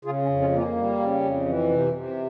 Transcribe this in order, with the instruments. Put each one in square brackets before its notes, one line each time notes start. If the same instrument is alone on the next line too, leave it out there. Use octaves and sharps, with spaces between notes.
[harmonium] C#3 F4 G#4
C#4
F2
C#4 F4
A#3
C#4 F4
G3
C#3
F2
E3
C3
C3